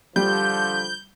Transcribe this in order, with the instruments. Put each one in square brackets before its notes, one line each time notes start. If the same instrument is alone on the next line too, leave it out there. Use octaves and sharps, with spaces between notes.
[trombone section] D3 F3 [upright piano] G3 [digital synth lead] G6